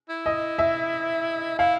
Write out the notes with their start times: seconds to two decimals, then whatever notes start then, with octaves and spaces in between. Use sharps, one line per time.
0.09 E4
0.26 D#5
0.59 E5
1.59 E4 F5